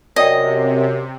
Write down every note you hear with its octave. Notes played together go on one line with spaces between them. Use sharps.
F#2 C3 D5 D#5 G5